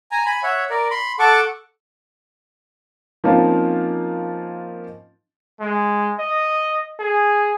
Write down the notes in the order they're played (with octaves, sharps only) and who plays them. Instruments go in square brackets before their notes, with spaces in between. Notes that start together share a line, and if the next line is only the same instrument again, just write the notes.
[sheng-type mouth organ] G#5 A#5
G#5 B5
C#5 E5 F#5
A#4 D5
B5 C6
A4 F#5 A5 C#6 D6
[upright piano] F3 A#3 C4 C#4 D#4 F4
[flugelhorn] G#3
D#5
G#4